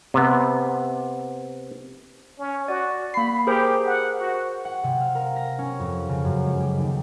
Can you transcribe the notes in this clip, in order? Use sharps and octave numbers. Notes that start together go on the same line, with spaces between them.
C3 B3
C#4
F#4 D5
A#3 B5 C7
G4 G#4 A#4 C5
F#5
F#4
F#5
C3
F5
A#4
A#6
C#4
F2
C#3
F#2
G#3
G4
D#2